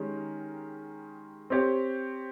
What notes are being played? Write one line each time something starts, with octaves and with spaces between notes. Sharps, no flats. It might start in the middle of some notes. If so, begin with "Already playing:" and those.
Already playing: D#3 G#3 C#4 G4 A#4
C4 G4 C#5